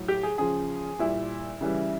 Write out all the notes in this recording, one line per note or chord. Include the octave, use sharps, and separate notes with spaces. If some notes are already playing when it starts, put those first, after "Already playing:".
Already playing: A2 F#3
G4
G#4
C#3 F3 G#4
A#2 G3 E4
C#3 E3 G3